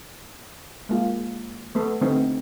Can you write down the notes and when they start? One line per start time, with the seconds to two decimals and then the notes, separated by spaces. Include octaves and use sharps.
0.89 G#3 A#3 F4
1.75 A3 B3 A4
2.01 D3 A3 B3 C4 D#4